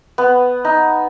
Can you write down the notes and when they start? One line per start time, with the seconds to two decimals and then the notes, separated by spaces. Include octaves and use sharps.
0.18 B3
0.65 D#4